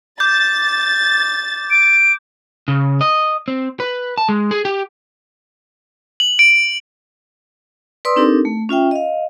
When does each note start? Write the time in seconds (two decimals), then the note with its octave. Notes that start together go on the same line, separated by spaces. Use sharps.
0.20 D6 G6 A6
1.71 D7
2.68 C#3
3.01 D#5
3.48 C4
3.80 B4
4.18 A5
4.29 G#3
4.51 G#4
4.65 G4
6.20 F#7
6.39 D7
8.05 B4 D5 C6 D#6 E6
8.16 C4 D4 D#4 G4 A4 A#4
8.45 A3
8.69 C#4 F4 E5 G5
8.91 D#5 F5